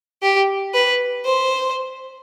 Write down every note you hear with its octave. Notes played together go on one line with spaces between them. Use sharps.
G4
B4
C5